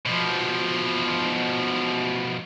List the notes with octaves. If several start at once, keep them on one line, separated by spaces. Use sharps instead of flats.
B2 F3